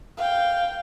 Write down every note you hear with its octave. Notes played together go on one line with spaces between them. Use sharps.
F5 G5